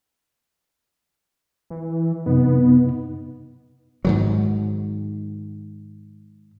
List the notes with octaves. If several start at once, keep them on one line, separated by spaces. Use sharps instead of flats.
E3
F#2 C3 B3 D#4
G#2 D#3 F#3